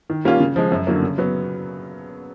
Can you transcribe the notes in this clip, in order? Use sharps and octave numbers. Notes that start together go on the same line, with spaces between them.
D#3
G3 A#3 C#4 F4
C#3
F3 G#3
F#2
D3 F#3 A#3
C#3
F#3 B3